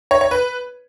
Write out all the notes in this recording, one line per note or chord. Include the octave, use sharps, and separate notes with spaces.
C#5
C#5
B4